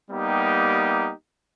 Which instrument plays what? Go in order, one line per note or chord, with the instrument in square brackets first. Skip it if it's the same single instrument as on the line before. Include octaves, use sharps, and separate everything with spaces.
[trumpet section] G3 A#3 B3 D#4 G4